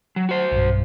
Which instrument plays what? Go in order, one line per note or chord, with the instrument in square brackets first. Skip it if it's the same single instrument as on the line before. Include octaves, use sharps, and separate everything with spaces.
[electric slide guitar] F#3
F#4 C5
[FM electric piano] B1 G2